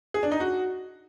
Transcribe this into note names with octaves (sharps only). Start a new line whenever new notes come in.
G#4
D4
D#4
F#4